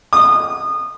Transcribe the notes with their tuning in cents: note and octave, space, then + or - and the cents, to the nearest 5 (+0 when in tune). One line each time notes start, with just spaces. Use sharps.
D#6 -25